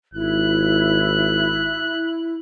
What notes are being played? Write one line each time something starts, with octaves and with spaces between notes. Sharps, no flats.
G#1 E4 F#6